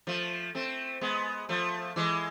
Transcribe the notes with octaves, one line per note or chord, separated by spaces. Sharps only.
F3 A3
A3 C4
G#3 B3
F3 A3
E3 G#3